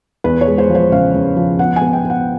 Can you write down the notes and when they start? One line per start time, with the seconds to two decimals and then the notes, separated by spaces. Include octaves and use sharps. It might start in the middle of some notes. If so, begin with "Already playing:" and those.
0.24 E2 B4
0.41 C#5
0.47 G#3
0.58 C5
0.70 F3
0.75 C5
0.92 C#3 F5
1.14 C#3
1.37 F3
1.59 B3 F#5
1.76 G#5
1.81 B3
1.93 G5
2.05 B3
2.10 F#5